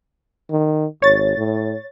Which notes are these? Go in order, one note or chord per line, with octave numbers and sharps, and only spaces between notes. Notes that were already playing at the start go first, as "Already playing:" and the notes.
D#3
G#1 C#5 A6
A2